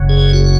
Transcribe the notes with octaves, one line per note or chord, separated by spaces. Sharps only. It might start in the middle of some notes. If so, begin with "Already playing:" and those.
Already playing: F#1 F#2 C#3
G#4
F#4